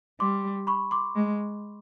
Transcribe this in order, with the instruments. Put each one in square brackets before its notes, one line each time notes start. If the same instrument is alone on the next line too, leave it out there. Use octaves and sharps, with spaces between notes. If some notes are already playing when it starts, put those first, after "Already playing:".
[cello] G3 [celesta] C6 D6
[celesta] B5 C#6
C6 D6
[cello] G#3